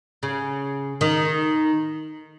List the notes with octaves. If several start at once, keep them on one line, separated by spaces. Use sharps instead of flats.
C#3
D#3